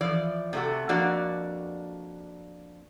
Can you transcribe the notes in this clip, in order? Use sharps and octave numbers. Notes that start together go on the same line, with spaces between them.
E3 F3 D5
C3 A3 F#4
F2 A#3 D4 F#4 D5